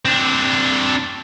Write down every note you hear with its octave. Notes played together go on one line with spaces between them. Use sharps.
C4 D4